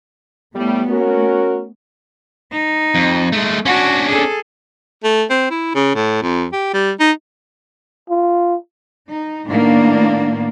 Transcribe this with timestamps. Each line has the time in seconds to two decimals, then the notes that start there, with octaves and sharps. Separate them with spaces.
0.55 A2 G3 A3 B3
0.88 C#4 F#4 A#4
2.52 D#4
2.95 F2
3.32 G#3 A3
3.65 C#4 D4 F#4
4.09 G#4 A4
5.04 A3
5.30 C4
5.50 E4
5.75 C#3
5.95 A2
6.22 F2
6.53 G4
6.74 G3
7.00 D#4
8.10 F4
9.10 D#4
9.48 A2 D#3 A#3 B3 D4